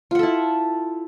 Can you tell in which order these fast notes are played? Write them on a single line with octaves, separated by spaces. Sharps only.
F4 F#5 A4 E4